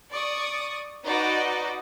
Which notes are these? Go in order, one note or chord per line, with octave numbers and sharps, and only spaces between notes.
D5 C#6 D#6
D#4 F#4 B4 D5 D#5